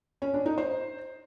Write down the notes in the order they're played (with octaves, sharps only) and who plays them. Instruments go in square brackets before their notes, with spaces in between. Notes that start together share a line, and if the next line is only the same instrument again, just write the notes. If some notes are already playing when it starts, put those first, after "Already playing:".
[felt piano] C#4
D4
D#4
C5